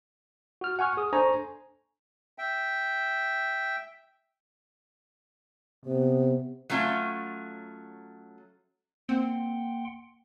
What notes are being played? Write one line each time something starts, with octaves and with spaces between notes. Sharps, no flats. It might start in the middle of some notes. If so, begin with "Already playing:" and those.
F#4 F6
F#5 G#5 C#6 F6
G#4 D#6
D4 A4 C5 G#5 A#5 C#6
E5 G5
C3 B3
F#3 A3 C#4 F4
A#3 C4 F#5 G5 C6